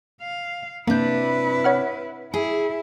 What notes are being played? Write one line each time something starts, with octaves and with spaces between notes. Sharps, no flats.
F5
C3 A#3 D4 E4 B4 G6
C#5 F#5 F6
E4 G#4